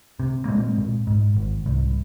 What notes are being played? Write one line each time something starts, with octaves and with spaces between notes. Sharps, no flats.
C3
A#3
A#2 G#3 C4
A#2
G#2
G#1
C2